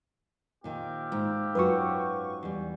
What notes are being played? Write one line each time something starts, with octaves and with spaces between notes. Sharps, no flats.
A#2 D#3 C4 G4 F5
G#2
F#2 F4 F#4 B4 C#6
E2 G3